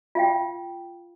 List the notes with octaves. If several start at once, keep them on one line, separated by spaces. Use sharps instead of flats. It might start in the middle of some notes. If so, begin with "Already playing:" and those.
F4 F5 G5